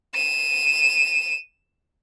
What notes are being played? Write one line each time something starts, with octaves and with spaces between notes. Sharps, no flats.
D#7 E7